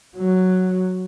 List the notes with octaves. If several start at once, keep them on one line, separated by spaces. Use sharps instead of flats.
F#3